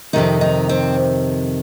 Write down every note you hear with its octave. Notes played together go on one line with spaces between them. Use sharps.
F2 C3 D#3 D#4
D#4
C4